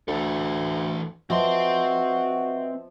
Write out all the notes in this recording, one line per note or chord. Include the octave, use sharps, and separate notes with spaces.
D2 E3 A4
F3 C4 F#4 B4 D#5 E5 C6